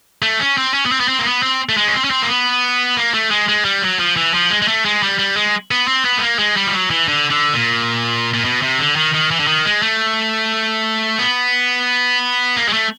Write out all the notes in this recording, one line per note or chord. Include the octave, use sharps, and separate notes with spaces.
A3
C#4
C4
C#4
B3
C4
B3
C4
A#3
B3
C4
A3
G#3
C#4
C4
C#4
C4
A#3
B3
A#3
A3
G#3
G#3
G3
F#3
F3
E3
F3
G#3
G#3
A3
G#3
G3
G3
G#3
B3
C4
B3
A3
A#3
G#3
G3
F3
F#3
E3
D3
D3
A#2
A#2
B2
C3
D3
D#3
D#3
E3
D3
D#3
G#3
A3
B3
A#3
G#3
A3